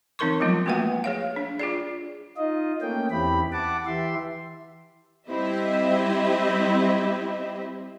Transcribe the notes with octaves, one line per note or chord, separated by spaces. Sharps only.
E3 C4 D#4 A#4 C6 C#6
F3 F#3 G#3 B3 F4
A3 A#3 F#4 B4 E5 F#5
G#4 C#5 F5
D4
F4 G#4 D5
D#4 F4 D#5
A3 A#3 C#4 G5
E2 C4 E4 G4 B5
F#5 A5 D6
E3 G4 E5 C6
G3 C4 E4 G4 D#5 E5